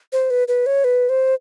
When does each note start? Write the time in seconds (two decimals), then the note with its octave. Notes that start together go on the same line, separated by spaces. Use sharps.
0.13 C5
0.30 B4
0.48 B4
0.66 C#5
0.84 B4
1.09 C5